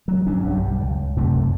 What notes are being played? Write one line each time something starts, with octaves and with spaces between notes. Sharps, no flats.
F#3
G1 F#3 C#4 D4
B1 G2 F3 G3
C#2
C2 F#2 C3 A3